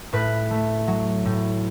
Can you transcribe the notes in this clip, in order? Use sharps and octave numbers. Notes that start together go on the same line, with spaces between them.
A2 B4
A3
F#3
A2